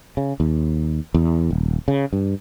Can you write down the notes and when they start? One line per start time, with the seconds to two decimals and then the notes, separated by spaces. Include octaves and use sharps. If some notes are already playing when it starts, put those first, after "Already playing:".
0.17 C#3
0.40 D#2
1.14 E2
1.51 D#1
1.88 C#3
2.13 G2